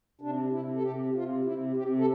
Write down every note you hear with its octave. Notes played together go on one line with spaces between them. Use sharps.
C3 D4
C3 E4
A4
C3 G4
C3 F4
C3 E4
C3 G4
A4